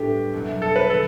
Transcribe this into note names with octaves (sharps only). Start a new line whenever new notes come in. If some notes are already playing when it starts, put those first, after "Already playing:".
Already playing: A2 G3 B3 D4 G4
C2 B2 F#3 B3 E4
A4
B4
D3 A4